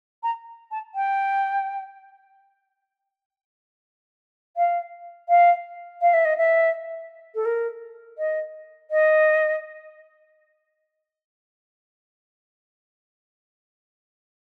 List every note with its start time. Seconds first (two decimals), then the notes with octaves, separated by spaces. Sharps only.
0.23 A#5
0.71 A5
0.95 G5
4.57 F5
5.29 F5
6.01 F5
6.14 E5
6.25 D#5
6.37 E5
7.35 A4
7.45 A#4
8.18 D#5
8.91 D#5